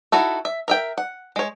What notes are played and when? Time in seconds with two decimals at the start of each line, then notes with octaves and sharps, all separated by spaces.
0.12 D#4 E4 F#4 A4
0.45 E5
0.68 A#4 E5 G5
0.98 F#5
1.36 G#3 C#5